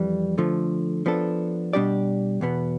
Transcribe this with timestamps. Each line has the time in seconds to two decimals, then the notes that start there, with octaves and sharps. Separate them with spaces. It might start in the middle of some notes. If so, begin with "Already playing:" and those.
Already playing: F2 E3 G3
0.38 D3 F3 A3
1.06 F3 B3 D4 A4
1.73 B2 G3 D4 G4 D5
2.41 E2 B2 B3